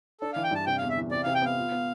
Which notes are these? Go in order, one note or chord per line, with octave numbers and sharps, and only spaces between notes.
D4 A4
E3 F5
G5
G2 A5
C3 G5
E2 F5
E5
E3
C3 D5
C3 F5
G5
B3 F5
F4
B3